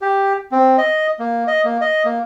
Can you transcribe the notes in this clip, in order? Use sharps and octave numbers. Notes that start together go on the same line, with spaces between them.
G4
C4
D#5
A#3
D#5
A#3
D#5
A#3